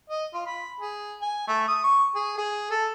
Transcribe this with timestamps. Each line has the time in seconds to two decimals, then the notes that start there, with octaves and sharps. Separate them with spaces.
0.10 D#5
0.34 F4
0.46 B5
0.80 G#4
1.21 G#5
1.48 A3
1.68 D#6
1.84 C#6
2.15 G#4
2.38 G#4
2.71 A4